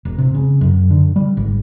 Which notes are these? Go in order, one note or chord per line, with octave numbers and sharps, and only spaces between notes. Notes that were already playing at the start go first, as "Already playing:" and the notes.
E1
C3
C#3
F#2
D3
G3
G#1